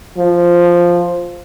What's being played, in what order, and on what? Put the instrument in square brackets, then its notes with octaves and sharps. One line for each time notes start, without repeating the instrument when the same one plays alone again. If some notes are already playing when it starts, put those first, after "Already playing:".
[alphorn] F3